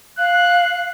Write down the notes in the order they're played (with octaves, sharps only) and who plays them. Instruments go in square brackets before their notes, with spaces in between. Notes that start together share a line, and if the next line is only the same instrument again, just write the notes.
[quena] F5 [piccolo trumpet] F#6